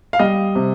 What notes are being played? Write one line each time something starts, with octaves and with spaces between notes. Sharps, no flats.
F5
G3 D#5
C3